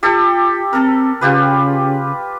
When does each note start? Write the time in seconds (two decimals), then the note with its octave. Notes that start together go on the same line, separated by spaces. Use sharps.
0.03 F4 G4 A4 E6
0.73 C4 A4 A#4
1.21 C#3 F4 G4 B4